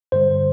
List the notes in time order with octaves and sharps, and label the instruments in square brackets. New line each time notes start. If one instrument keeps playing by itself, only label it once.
[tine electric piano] G2 D3 G3 C5